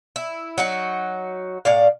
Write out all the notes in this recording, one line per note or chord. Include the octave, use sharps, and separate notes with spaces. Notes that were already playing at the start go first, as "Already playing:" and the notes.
E4
F#3 D#4 F#4
A2 D5 F5